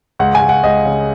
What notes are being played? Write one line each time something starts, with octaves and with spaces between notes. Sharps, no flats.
C#2 F#5
G#5
C#2
F#5
C#2 D#5
C#3